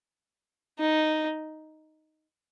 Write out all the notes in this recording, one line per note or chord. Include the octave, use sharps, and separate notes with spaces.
D#4